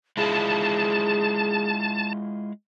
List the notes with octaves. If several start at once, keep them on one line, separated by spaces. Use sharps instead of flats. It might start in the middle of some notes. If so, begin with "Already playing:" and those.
G#3 E4 F4 G#4 A5